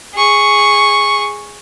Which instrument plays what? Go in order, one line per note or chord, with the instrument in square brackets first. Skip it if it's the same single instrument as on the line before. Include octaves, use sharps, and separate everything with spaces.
[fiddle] G#4 C#6